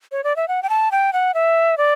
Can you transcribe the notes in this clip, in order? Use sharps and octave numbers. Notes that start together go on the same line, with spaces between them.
C#5
D5
E5
F#5
G5
A5
G5
F#5
E5
D5